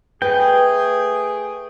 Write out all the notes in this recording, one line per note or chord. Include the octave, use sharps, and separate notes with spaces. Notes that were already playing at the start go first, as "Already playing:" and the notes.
A3 G#4 B4 G5